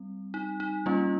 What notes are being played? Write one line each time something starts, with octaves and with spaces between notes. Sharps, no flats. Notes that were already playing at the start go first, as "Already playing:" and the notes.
Already playing: G3 C4
D#4
D#4
G3 A#3 C#4 F4